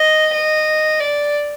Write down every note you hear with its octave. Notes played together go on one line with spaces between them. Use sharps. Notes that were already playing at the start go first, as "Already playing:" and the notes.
Already playing: D#5
D#5
D5